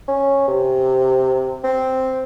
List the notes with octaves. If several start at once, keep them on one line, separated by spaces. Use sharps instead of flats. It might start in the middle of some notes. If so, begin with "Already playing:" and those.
C#4
C3
C4